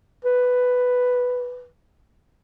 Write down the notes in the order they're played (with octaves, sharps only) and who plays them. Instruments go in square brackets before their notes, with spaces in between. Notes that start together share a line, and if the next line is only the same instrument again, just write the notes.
[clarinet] B4